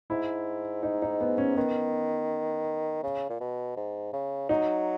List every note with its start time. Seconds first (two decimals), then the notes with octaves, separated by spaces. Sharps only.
0.10 G#2 E4
0.83 D#4
1.02 D#4
1.21 B3
1.38 C#4
1.56 D#3 B3
3.03 C#3
3.29 A#2
3.40 B2
3.76 G#2
4.13 C#3
4.49 F#3 D#4